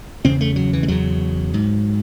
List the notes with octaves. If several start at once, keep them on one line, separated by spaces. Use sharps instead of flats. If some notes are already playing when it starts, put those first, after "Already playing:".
E2 C#3 C4
A3
F#3
E3
G#3
E2 C#3 F#3
G#2